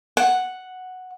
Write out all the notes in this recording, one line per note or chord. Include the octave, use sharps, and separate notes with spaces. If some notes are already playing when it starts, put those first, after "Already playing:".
F#5